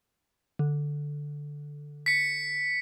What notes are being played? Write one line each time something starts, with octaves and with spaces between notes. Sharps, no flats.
D3
B6 C#7